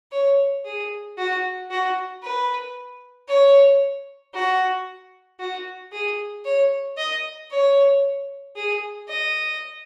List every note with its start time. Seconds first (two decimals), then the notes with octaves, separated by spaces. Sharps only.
0.12 C#5
0.65 G#4
1.18 F#4
1.70 F#4
2.23 B4
3.28 C#5
4.34 F#4
5.40 F#4
5.92 G#4
6.45 C#5
6.97 D#5
7.50 C#5
8.56 G#4
9.08 D#5